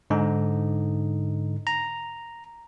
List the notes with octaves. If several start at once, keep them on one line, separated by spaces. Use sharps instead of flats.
G#2 D3 D#4
A#5